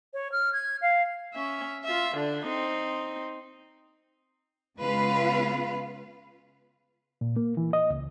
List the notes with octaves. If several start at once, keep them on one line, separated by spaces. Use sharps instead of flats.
C#5
F6
G#6
F5
C#4 E5
F4 E5
D3 D4
C4 D#4
C#3 G#3 B3 F4 B4 F5
A#2
A#3
E3
D#5
C#2